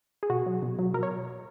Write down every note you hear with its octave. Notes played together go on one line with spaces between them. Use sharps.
G#4
B2 F#4
F#3
B2
F#3
B2 A#4
C#5